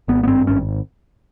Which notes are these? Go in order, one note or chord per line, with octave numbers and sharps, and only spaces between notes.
G#1 B3
B3
G2 C4
G#1 C#4